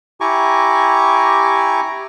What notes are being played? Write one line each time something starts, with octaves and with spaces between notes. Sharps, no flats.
E4 G4 G#5 A#5 C#6 D6